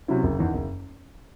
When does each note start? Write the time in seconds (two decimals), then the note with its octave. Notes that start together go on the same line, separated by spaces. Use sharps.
0.08 C3 F#3 C#4 E4
0.23 F#1
0.38 E2 D#3
0.53 F#1